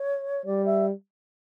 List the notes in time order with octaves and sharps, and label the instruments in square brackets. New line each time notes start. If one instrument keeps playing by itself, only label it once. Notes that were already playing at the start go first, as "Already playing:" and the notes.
Already playing: [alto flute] C#5
[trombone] G3 [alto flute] D5
[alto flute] E5